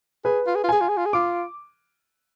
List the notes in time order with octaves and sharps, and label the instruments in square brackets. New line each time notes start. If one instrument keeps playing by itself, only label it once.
[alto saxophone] G#4 [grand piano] B4
[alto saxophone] F4
G#4
F4
[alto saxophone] G#4 [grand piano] G#5
[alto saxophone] F4
G#4
F4
G#4
[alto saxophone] F4 [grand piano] D6